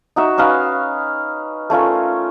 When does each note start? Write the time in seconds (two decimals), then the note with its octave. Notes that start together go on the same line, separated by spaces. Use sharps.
0.16 D#4 F#4 E5
0.38 C#4 D#4 B4 F5
1.70 A3 C#4 F4 A#4